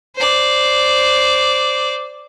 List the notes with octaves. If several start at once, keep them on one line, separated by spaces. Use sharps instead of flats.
C5 D5